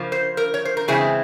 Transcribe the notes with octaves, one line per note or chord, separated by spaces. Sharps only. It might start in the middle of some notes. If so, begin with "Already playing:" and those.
Already playing: C#3 F3 A#3
C5
A#4
C#5
C5
A#4
C#3 E3 G#3 C4 E4 G#4